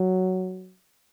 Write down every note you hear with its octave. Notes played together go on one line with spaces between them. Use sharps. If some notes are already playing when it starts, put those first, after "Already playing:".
Already playing: F#3